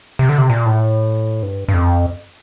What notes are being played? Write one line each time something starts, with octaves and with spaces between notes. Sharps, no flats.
C3
D3
C3
A#2
A2
G2
G2
F2